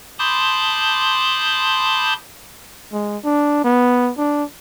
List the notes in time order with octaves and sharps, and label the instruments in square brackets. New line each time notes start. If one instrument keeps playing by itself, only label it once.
[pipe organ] A5 B5 C6 D6 D#6 G6
[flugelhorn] G#3
D4
B3
D4